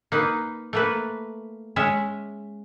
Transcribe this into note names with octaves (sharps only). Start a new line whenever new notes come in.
A#3 D#4 B4
A3 A#3 B4
G#3 C#4 E5